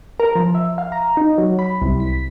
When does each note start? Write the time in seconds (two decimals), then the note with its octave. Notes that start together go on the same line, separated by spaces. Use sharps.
0.20 A#4
0.35 F3
0.55 E5
0.78 F5
0.92 A#5
1.17 D#4
1.38 F#3
1.59 B5
1.82 C2
2.00 B6